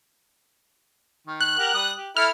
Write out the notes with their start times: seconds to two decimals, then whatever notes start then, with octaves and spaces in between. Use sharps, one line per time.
1.27 D#3
1.40 F#6
1.58 G4 A#4 F#5
1.74 G3 D#6
1.96 G4
2.17 E4 A4 F6